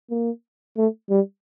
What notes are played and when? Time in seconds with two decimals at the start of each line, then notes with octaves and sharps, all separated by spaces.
0.11 A#3
0.77 A3
1.10 G3